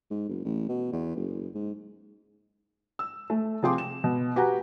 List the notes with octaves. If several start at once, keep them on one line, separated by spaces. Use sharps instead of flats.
G#2
F#1
A1
B2
E2
F#1
G#2
E6
A3
C3 F3 G#4 G5 C6 D6
E7
B2
F#4 G4 B4 F#5 G#5 A#5